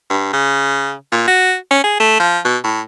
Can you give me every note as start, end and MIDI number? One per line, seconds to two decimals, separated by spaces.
0.10 0.33 43
0.33 0.93 49
1.12 1.24 46
1.27 1.55 66
1.71 1.83 61
1.84 1.97 68
2.00 2.19 57
2.19 2.39 53
2.45 2.57 47
2.64 2.81 45